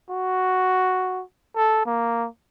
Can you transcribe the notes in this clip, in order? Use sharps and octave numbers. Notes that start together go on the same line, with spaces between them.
F#4
A4
A#3